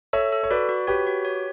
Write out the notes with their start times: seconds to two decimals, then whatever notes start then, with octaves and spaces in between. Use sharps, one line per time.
0.13 A4 C#5 E5
0.32 A4
0.43 C#5
0.50 F#4 B4 D5
0.69 F#4
0.87 G4 B4 C#5
1.07 F#4
1.25 C#5